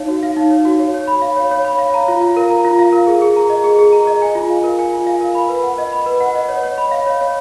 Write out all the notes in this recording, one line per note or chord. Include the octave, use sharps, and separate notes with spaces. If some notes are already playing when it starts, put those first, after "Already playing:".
Already playing: D#4 C#5 F5
F#4
F5
D#4
C#5
F#4
C#5
C#5
B5
F5
C#5
C#5
B5
F5
A#5
F4
F5
A#4
A#5
F4
F5
A#4
G#4
G#4
A#5
D#5
G#4
G#4
A#5
D#5
G#5
F4
F5
A#4
G#5
F4
F5
A#4
B5
B4
F#5
D#5
B5
B4
F#5
D#5
C#5
C#5
B5
F5
C#5
C#5